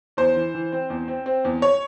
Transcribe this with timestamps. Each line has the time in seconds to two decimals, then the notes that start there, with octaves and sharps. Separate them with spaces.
0.17 E2 C5
0.36 E3
0.54 E3
0.72 C4
0.90 E2
1.08 C4
1.26 C4
1.45 E2
1.62 C#5